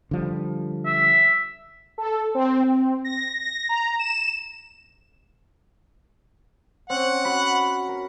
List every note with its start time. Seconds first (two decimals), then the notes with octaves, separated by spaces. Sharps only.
0.11 D3 F3 G3
0.86 E5
1.98 A4
2.35 C4
2.64 C4
3.05 A#6
3.40 A#6
3.69 A#5
3.99 E7
6.90 C4 C#4 F#5
7.25 F#4 B5
7.89 A#4